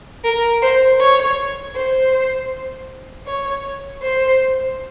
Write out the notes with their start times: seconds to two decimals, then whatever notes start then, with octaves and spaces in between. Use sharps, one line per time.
0.24 A#4
0.62 C5
1.00 C#5
1.75 C5
3.26 C#5
4.02 C5